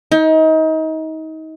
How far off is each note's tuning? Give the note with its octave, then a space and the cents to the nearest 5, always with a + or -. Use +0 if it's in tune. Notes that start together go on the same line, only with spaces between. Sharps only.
D#4 +30